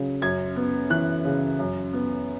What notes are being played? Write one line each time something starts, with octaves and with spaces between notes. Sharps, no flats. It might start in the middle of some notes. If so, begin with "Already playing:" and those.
Already playing: C#3 F#3
F#2 G#6
B3
E3 F#6
C#3
F#2
B3